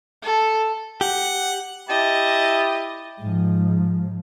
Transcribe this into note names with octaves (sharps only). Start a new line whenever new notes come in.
A4
G4 F#5
E4 G4 D#5 A5
G#2 F3